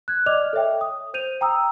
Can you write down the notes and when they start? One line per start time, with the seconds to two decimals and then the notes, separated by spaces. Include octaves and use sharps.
0.08 F#6 G#6
0.26 D5 D#5 D6 F6 F7
0.53 A4 C#5 E5 G5
0.81 D#6
1.14 C5 G6 D#7 F7
1.41 G5 A#5 D#6 E6